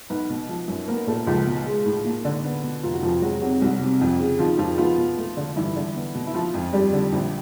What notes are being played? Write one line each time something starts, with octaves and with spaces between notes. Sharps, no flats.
B1 B3 B4
B2
F3
F#2
A#3 B3 A#4
A#2 A3 A4
C#2 F3 F4
B2
G#3
A2
A#3
D3
B3
B2
F1 F4
F#4
F2 F3 F4
F#3 G#3 F#4
C3 F#3 F#4
C2 F#3 F#4
C3
F2
C#3
D#3 F3 F4
F2 F3 F4
F3 B3 F4
B2
A3
D3
G2 E3 E4
D3
B3
B2
E4
F3 F4
F2
G2 G3 G4
D3
A#1